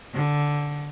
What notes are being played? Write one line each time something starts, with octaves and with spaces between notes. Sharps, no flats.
D3